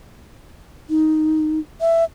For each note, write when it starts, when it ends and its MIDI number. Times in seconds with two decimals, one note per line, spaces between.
0.90 1.59 63
1.81 2.04 76